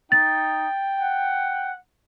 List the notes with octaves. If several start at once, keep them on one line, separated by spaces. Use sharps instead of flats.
D#4 G5 A6
F#5